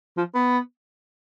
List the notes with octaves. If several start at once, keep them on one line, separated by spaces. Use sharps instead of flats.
F3
B3